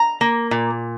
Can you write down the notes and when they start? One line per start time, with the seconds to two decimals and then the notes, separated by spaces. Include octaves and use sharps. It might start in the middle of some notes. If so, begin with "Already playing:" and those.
Already playing: A#5
0.21 A#3
0.51 A#2